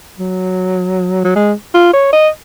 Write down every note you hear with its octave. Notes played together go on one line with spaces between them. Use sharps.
F#3
F#3
G#3
F4
C#5
D#5